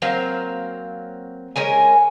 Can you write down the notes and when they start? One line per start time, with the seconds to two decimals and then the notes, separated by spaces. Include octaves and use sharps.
0.02 F#3 A#3 C4 F5
1.56 G#3 C#4 A#4 G#5